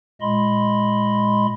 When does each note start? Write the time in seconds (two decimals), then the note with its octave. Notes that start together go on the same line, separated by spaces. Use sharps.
0.21 A#2 G#3 D#5 B5 C6